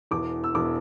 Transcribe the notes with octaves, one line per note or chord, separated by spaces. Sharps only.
E1 E2 E3 D6
E6
E1 E2 E3 D6